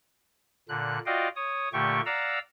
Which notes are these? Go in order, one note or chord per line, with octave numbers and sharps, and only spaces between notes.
A#2 D3 F#6
F4 F#4 D5 D#5 F5 G5
C#5 D#6
A#2 D3 A3 G4 G5 C#6
D5 F5 F#5 A#5 E6